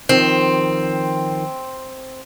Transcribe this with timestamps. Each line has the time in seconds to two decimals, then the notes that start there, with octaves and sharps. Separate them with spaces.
0.09 D#3 F3 C4